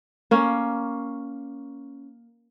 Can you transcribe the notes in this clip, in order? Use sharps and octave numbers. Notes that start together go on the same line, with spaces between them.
A#3 C#4